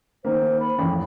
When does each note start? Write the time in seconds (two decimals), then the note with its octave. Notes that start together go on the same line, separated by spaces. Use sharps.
0.25 D#3 A#3 C5
0.60 B5
0.79 A1 F2